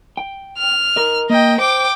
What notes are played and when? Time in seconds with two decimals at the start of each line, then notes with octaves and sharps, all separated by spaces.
0.17 G5
0.58 F6
0.96 A#4 D#5
1.30 A#3 D#5 G5
1.58 C5 G5 D6